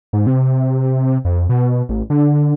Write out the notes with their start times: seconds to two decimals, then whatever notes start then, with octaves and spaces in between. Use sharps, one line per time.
0.13 G#2
0.27 C3
1.25 F2
1.49 B2
1.89 A1
2.10 D3